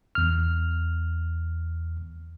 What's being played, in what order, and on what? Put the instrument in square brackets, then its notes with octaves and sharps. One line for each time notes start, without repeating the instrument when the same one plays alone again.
[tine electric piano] E2 F6